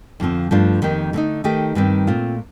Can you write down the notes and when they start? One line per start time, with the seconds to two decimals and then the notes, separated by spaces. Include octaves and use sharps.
0.20 F2 D3 F3 C4
0.51 G2 F3 A3 D4 F4
0.82 F2 D#3 A#3 D#4 G4
1.13 D3 A3 C4 D#4
1.44 D#3 A3 D#4 G4
1.75 G2 D#3 G3 C4 G4
2.07 A#2 A3 C4 F4